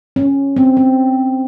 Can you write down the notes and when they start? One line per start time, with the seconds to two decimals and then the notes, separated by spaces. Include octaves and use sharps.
0.16 C#4
0.57 C4
0.77 C4